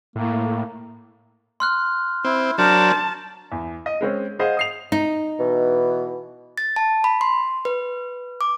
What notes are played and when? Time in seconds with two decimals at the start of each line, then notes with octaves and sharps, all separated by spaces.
0.16 A2 A#3
1.60 C6 F6 F#6
2.24 C4 E4
2.58 F#3 D4 A#4 C5 A5
3.52 E2
3.86 D#5
4.01 G#3 C4 C#4
4.39 G#4 C5 D#5 F5 F#5
4.57 D#6 C7 F7
4.92 D#4
5.40 B2 E3
6.58 A6
6.76 A5
7.04 B5
7.21 C6
7.65 B4
8.41 D6